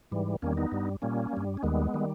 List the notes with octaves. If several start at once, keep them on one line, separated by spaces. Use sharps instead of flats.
G#2 E3 G3
E2 D#3 G3 A#3 C#4
B3 D#4
G2 G3
A#2 G3 A#3 C#4
G2 G3
C#4
D#2 D#3 G3 G#3 B3
D#3 G3